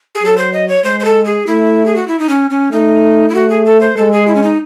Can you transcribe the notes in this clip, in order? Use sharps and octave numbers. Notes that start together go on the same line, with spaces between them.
G#4
F#3 A4
C5
D#5
C#5
G#3 C5
C5
A4
G#4
A3 E4
G#4
F#4
E4
D#4
C#4
C#4
A3 D#4
E4
A3 F#4
G#4
A4
C5
G#3 A4
G#4
E4
C#4
D#4